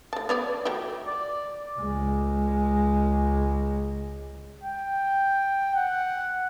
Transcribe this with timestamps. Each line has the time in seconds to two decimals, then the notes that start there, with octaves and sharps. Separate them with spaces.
0.13 A3 A5
0.29 B3 C#5 D5
0.65 F#3 A3 G4
1.07 D5
1.79 C#2 G#3
4.63 G5
5.75 F#5